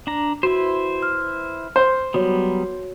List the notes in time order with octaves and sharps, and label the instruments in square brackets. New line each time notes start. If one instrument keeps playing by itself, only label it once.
[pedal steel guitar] D4 A#5
[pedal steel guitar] E4 B4 C5 [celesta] F#4
[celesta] F6
[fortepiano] C5
[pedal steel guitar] F#3 G3 B3 [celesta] F#4 C#5